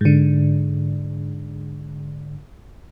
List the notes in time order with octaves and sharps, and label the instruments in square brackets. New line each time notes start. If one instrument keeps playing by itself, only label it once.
[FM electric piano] G#2 D3